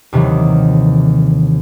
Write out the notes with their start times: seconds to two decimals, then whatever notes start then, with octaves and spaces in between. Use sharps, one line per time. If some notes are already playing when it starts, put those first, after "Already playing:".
0.13 D#2 C3 D#3 E3 F#3